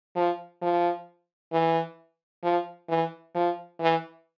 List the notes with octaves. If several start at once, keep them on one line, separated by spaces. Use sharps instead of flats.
F3
F3
E3
F3
E3
F3
E3